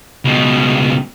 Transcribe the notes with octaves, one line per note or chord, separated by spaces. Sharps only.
C#2 B2